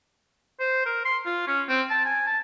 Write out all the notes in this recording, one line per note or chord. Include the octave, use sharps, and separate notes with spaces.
C5
A#4
C6
F4
C#4
C4
A5
G#5
A5